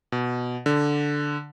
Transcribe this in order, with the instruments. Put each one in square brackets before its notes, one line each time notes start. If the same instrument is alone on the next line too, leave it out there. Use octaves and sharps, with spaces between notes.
[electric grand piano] B2
D3